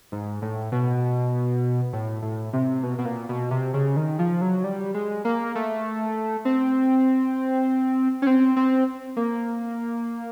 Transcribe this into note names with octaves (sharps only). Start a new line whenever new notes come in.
G#2
A2
B2
A2
A2
C3
B2
B2
A#2
B2
C3
C#3
D#3
F3
F#3
G3
G#3
A#3
A3
C4
C#4
C4
C4
A#3